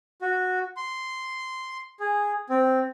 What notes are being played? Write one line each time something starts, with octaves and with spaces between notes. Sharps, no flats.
F#4
C6
G#4
C4